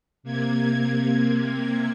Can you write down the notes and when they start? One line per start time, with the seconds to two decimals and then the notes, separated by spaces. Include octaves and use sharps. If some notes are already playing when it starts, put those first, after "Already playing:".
0.23 C3 A#3 G#6